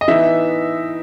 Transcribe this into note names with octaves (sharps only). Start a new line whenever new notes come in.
D#5
E3 B3 D#4 E5